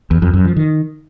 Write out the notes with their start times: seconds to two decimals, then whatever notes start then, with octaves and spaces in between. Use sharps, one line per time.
0.11 E2
0.22 F2
0.34 F#2
0.45 F3
0.56 D#3